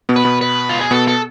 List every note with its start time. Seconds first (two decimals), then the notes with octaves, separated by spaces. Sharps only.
0.09 B2 B3
0.16 B4
0.24 B2 B3
0.41 B4
0.69 F4
0.80 G#4
0.91 B2 B3 A4
1.08 A4